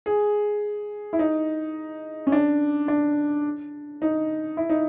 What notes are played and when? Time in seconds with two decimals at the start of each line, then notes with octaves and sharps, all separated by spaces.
0.06 G#4
1.13 E4
1.19 D#4
2.27 C#4
2.32 D4
2.88 D4
4.02 D#4
4.57 E4
4.70 D#4